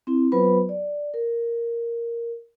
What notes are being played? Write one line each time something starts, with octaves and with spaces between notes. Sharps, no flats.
C4 E4
F#3 B3 F4 B4 C5 B5
D5
A#4